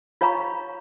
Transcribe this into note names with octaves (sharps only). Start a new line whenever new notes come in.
F4 C#5 F5 A#5 B5 C#6